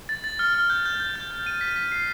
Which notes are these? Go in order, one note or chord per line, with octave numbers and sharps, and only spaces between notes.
A6
A6
F6
F6
G6
G6
G6
G6
G6
D#7
B6
B6
C7